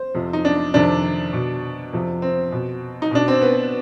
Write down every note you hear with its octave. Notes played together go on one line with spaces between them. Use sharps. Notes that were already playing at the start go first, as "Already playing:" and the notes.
Already playing: C5
F2 C3 F3
D#4
D4
F2 C3 D#3 D4
B2
F2 C3 F3
C4
B2
D#4
B2 D4
C4
B3